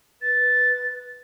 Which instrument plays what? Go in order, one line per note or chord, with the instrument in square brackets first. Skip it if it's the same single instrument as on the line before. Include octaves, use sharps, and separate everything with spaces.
[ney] B4 [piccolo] A6